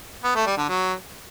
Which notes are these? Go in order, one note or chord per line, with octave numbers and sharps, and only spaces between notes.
B3
A3
G3
D3
F#3